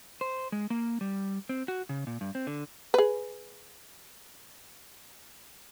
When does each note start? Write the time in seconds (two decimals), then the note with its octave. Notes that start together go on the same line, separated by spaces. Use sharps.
0.21 C5
0.52 G#3
0.70 A#3
1.01 G3
1.49 C4
1.68 F#4
1.89 C#3
2.07 A#2
2.21 G2
2.35 C4
2.47 D3
2.94 G#4 B4